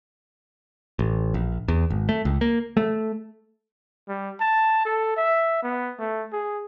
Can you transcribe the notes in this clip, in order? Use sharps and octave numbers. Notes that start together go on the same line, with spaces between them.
A1
A#1
E2
G#1
A3
C#2
A#3
A3
G3
A5
A4
E5
B3
A3
G#4